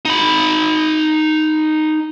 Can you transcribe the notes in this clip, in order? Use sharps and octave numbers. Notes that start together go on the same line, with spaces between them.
D#4 B5